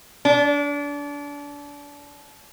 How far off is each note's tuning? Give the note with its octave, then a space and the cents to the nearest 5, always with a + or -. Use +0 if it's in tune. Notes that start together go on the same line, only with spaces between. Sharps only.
D4 -30